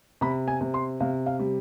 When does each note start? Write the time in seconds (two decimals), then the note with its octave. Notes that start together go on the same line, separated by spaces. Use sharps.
0.21 C3 B5
0.48 G#5
0.61 C3
0.74 C6
1.01 C3 F5
1.26 F5
1.39 G3